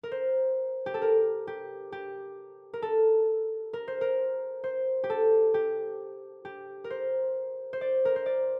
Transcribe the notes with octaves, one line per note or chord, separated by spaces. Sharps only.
A#4
C5
G4
A4
A#4
G4
G4
A#4
A4
A#4
C5
A#4
C5
G4
A4
G4
G4
A#4
C5
C5
D5
A#4
C5
D5